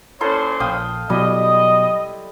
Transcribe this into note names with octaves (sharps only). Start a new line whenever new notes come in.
A#2 C#4 E4 A4 C5 C6
A#1 F5 G5 D#6
B2 F#3 G3 E4 D#5